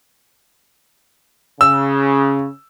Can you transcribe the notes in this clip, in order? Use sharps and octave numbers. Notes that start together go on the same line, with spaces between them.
C#3 E6